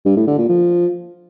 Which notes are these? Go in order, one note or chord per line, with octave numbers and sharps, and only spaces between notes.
G2
A2
D3
A#2
F3